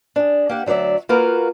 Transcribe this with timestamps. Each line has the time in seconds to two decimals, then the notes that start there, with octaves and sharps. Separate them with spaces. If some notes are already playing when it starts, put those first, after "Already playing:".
0.16 D4 G#4
0.49 A#3 G4 F#5
0.66 D2 F#3 A#4 D5 E5
1.09 A#3 F4 F#4 A#4 B4